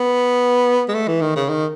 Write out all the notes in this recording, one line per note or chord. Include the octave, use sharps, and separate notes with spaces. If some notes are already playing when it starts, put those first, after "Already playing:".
Already playing: B3
G#3
A3
E3
D#3
C#3
D#3